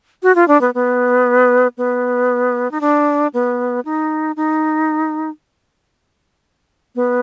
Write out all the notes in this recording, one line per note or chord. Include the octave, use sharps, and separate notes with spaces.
F#4
F4
D4
B3
B3
B3
D#4
D4
B3
D#4
D#4
B3